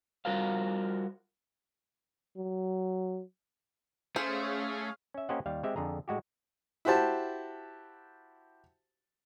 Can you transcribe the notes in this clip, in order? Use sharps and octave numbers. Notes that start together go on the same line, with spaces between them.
G3 F4 F#4 A#4 C5 F5
F#3
A3 C#4 G#4 C5 F5
C#4 E5
A#3 C#4 G4 C5 D#5 F#5
D#2 G3 F5
G#3 C4 G4 E5
F2 D3 G#4 A#5
A2 G#3 F#4 G4
E4 F#4 G4 C5 A5